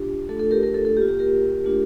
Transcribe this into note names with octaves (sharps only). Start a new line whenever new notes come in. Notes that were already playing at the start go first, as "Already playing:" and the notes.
Already playing: D4 F4 G4
A3 D4 F4 A4
A4
G4 A#4
G4 A#4
A4
A4
A#3 F4 G4
G4
G4 A#4
A3 D4 F4